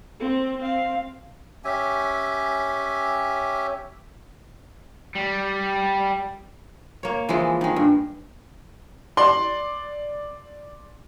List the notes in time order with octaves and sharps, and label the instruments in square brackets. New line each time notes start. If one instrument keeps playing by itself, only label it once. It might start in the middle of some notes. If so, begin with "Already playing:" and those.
[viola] C4
C4 F5
[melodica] C#4 G4 E5 G#5
[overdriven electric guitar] G3
[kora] A#3 C#5
E3 F3 G#3
D#3 G#3
G2
[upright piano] D5 C6